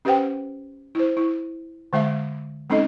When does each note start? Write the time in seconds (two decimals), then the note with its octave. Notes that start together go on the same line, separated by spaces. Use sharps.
0.05 C#4 G4 B4 C5 F#5 G5
0.95 E4 C5
1.17 E4
1.93 D3 G#3 E5 F5
2.70 G#3 C4 C#4 D#4 A4 D#5